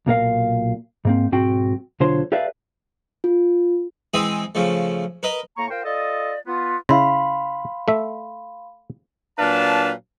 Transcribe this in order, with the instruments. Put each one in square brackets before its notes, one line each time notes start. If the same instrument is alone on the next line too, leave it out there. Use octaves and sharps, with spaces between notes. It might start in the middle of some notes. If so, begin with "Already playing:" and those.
[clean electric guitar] B1 A#2 A#4 F5
G#2 A#3 C4
B1 G#2 C4 F#4 G5
B1 D3 F4 C5 C#5 C6
G4 A4 B4 D5 E5 F5
[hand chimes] F4
[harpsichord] E3 G#3 C4 G#4 E5 D#6
C#3 F3 A3
A#4 B4 D#5
[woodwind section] A2 A#3 C#6 [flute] A#5
[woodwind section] F4 A#4 C5 [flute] G5
[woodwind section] F4 A4 D#5 [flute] D5
[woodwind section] B3 [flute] F4
[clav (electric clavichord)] C#3 E4 [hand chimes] F5 B5 C6
[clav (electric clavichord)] A3 E5
[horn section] A#2 F#3 D4 B4 F5 A5